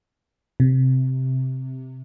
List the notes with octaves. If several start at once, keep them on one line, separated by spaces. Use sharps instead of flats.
C3